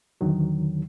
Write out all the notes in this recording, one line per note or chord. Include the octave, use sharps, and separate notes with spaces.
E2 D3 D#3 F#3